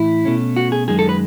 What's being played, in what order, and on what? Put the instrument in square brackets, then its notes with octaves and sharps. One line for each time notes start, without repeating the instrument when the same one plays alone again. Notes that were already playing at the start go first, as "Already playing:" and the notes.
Already playing: [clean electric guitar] A2 E3 E4
B2 A3 C#4
F#4
G#4
F#2 D#3 G#3 G#4
A4
B4